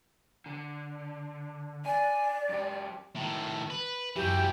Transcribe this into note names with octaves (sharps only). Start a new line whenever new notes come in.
D3
D5 G#5
F#2 G4
A2 D#3
B4
F#2 E3 F#3 G4 G5